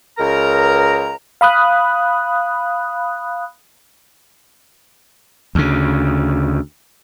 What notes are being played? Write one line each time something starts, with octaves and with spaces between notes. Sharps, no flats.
C#2 A#4 A#5
F5 B5 D#6 F#6
D2 C#3